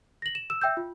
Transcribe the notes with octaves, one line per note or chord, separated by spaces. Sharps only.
A#6 F#7
E7
E6 E7
E5 G5 E6 G6
F4